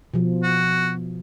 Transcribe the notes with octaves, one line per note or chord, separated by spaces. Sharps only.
B2 F3
F#4